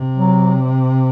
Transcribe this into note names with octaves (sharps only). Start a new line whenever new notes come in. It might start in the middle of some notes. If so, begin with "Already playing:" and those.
Already playing: C3
F#3